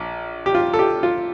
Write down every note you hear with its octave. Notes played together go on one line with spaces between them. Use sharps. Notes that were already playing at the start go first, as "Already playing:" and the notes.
Already playing: A#1
G4
F4
A4
G4
F4